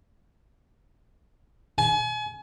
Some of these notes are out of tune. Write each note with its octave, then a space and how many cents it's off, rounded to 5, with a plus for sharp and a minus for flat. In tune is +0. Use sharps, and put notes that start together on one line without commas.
G#5 +35